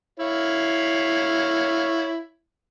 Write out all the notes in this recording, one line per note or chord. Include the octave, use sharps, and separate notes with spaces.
E4 C#5 F5